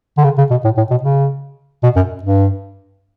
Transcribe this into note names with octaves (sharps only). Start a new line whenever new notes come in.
D3
C#3
C#3
B2
A2
A2
B2
C#3
B2
F#2
G2